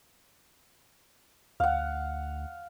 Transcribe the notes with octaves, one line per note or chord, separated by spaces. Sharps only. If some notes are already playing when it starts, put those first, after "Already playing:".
D2 F5 F#5